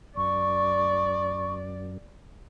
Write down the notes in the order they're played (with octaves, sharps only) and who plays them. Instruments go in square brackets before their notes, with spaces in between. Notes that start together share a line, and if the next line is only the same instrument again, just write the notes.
[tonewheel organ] F#2 [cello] D5 [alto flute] C#6